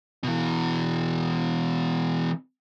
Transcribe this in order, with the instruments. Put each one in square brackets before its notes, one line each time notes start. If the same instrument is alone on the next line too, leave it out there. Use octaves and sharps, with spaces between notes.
[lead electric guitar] B2 E3